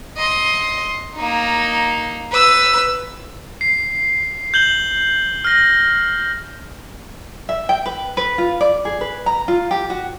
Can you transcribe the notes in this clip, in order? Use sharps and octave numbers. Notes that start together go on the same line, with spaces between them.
D#5 C6
A#3 D#4
B4 E6
C7
G6 F#7 G7
F6 A#6
E5
G5
B4
B4
F4
D5
G#4
B4
A#5
F4
G4
F#4